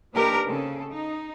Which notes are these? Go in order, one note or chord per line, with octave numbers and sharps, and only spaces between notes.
A#3 D4 D#4 G4 A#4 B4
C#3 C4 A4
D#4